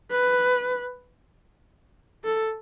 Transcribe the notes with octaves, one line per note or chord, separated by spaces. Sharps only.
B4
A4